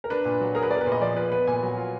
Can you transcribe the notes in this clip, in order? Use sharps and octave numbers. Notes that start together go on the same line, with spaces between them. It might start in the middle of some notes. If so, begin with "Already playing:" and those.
A#4
D4 B4
A#2
F#3
G#4 A#4
B4
B3 D5
A#4
B4
A#2
D#5
F3 D5
F4 B4
B3 B4
A#2 G#5
F#3
F4